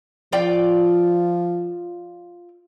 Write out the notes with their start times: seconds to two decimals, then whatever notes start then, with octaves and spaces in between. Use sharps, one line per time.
0.32 F3 F4 D5 G5